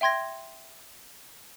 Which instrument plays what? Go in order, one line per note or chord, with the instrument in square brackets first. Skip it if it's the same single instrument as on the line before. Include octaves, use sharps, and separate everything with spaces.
[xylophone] E5 G5 C6 G#6 A#6